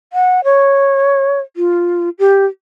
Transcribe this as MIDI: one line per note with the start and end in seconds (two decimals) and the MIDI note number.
0.13 0.44 78
0.44 1.40 73
1.57 2.10 65
2.19 2.45 67